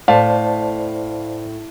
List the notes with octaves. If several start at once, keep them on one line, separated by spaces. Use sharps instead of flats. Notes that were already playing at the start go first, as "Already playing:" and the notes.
A2 C5 D5 F5 A5